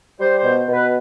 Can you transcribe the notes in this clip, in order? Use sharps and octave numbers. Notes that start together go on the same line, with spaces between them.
G3 C5
B2 C5
B2
B4